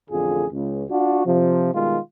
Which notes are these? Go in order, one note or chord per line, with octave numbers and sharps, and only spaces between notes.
A1 F2 D3 F4 G#4
C#2
D4 F4 F#4
C3 F3
B2 D#3 G3 G#3 F4